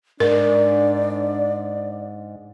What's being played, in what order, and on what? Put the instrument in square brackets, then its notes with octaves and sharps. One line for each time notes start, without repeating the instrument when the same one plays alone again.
[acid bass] G#2 [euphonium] D4 [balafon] A#4 [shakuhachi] D5